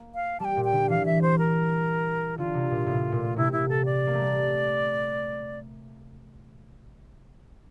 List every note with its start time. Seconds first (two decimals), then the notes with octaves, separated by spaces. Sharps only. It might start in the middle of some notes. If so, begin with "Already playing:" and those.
Already playing: A#3
0.15 F5
0.40 G3 A5
0.45 G5
0.57 A#2
0.65 G5
0.72 D3
0.89 E3 F5
1.06 E5
1.22 C5
1.39 A#4
2.38 D3 F4
2.54 C3
2.71 A#2
2.86 A2
3.12 A#2
3.36 C3 E4
3.52 E4
3.69 A4
3.85 D5
4.07 A#3
4.13 A3
4.21 G3